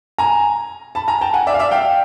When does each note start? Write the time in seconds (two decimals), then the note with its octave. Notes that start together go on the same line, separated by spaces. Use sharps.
0.18 G#5 A#5
0.95 A5 B5
1.08 G#5 A#5
1.21 G5 A5
1.34 F#5 G#5
1.47 D5 E5
1.54 F5
1.59 D5 E5
1.71 F5 G5